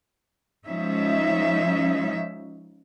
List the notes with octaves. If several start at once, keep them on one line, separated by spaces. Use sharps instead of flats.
F3 G#3 C#4 D#4 E5